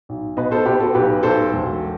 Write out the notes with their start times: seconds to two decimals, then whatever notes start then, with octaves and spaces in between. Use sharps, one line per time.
0.09 B1
0.37 B2 B4 D#5
0.51 A4 C5
0.66 B2 G4 B4
0.80 F#4 A4
0.95 B1 G4 B4
1.23 B1 A4 C5
1.53 E1